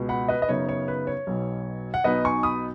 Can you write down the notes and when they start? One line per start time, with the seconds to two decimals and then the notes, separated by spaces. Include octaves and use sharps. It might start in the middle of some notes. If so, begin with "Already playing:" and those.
Already playing: C#2 B2 B3
0.09 F#5 B5
0.29 B4 D#5
0.42 D#5
0.48 F#2 C#3 B3 D#4 C#5
0.69 C#5
0.88 B4
1.07 C#5
1.27 B1 B2 F#3
1.94 F#5
2.04 B1 B2 B3 D#4 B4 D#5
2.25 G#5 C#6
2.43 B5 D#6